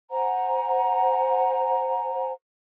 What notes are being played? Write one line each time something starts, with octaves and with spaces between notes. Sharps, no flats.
C5 F#5 G#5 A#5